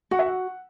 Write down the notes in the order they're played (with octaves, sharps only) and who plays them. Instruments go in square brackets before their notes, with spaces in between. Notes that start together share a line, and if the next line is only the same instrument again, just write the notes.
[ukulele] F#4 [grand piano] F#5
[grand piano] E5
F#5